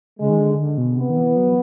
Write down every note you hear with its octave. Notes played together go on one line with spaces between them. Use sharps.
C#3 G#3
D#3
D3
D3
B2
C3 B3
D#3
E3
F#3